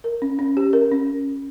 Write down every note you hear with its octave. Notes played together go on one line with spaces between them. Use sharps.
A#4
C#4
C#4
G4
A#4
C#4